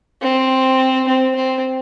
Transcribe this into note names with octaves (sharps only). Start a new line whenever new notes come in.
C4
C4
C4